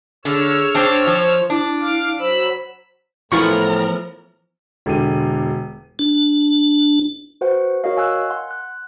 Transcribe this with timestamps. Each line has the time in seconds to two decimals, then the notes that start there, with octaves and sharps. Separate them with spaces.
0.25 D3 G#4 C#5 E6 F6
0.75 C4 D4
1.07 F3 C5
1.50 D4 E4
1.80 F5 D6
2.19 F#3 C5 B5 E6
3.32 A2 E3 F3 B3 E4 F4 A#4 C#6
4.86 E1 D3 G4 D#7
5.99 D4
7.41 F#4 B4 C5 F#5
7.84 F#4 A#4 C#5 D#5 F5
7.96 F5 G#5 E6 F#6
8.30 F#5 C6
8.51 F#6